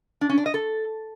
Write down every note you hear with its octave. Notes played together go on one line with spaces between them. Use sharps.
D4
C#4
D4
D#5
A4